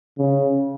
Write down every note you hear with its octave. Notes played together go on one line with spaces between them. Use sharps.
C#3